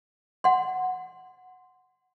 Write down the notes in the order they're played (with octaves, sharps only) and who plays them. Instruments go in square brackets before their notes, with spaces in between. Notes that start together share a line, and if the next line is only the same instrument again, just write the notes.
[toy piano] F#5 C6